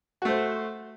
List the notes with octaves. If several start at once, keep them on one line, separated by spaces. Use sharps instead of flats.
A3 F#4 C5